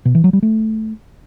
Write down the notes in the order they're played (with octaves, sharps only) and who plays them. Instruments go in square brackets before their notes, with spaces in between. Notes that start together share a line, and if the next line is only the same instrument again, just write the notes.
[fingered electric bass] B2
E3
F#3
G3
A3